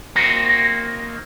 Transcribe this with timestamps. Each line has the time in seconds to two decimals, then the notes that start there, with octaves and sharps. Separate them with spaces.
0.16 A#3 C4 D#4 F#4